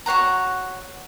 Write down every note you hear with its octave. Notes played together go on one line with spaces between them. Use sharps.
F#4 C#5 F#5 A#5